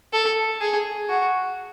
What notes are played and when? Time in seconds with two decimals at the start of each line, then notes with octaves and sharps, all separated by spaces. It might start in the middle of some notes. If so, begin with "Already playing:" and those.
0.13 A4
0.61 G#4
1.09 F#4